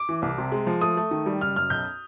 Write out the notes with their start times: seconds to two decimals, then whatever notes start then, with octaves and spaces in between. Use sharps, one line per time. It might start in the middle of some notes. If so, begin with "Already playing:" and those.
Already playing: D6
0.09 E3
0.22 C2
0.38 C3
0.52 G#3
0.67 F3
0.81 A3 D#6
0.97 A3
1.11 D#3
1.26 G3
1.41 F#1 F6
1.56 F#2 F6
1.70 B1 G6